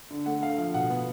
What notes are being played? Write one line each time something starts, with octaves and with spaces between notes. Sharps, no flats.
D3
A3 F#5
D3 F5
F3 F5
B2 F#5
B3